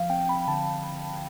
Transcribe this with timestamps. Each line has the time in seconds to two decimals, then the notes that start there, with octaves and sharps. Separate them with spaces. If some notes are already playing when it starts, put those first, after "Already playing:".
Already playing: F3 F5
0.10 C4 G5
0.28 C4 B5
0.48 D3 A5